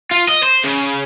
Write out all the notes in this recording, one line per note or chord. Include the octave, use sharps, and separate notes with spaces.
F4
D#5
C5
C#3